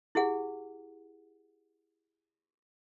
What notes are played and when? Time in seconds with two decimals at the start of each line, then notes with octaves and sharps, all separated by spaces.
0.15 E4 G4 G#4 F#5